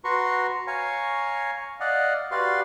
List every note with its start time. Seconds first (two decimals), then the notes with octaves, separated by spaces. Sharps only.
0.04 F#4 B4 A#5 C6 C#6
0.67 C#5 F5 G#5 A#5 C#6
1.80 D5 D#5 F5 F#5
2.31 F#4 G4 B4 D5 F5 C6